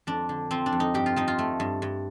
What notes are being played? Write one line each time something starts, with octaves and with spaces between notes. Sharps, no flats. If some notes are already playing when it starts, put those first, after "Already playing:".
F2 D4
D3
F3 C4
D4
F2
D#4
G2 G4
F4
F3 D#4
F4
A3
G2
G2